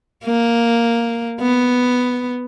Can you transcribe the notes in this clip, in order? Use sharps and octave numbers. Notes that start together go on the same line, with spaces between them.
A#3
B3